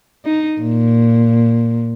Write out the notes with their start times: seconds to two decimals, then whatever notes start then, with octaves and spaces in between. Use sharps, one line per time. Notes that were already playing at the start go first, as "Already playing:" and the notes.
0.25 D#4
0.61 A#2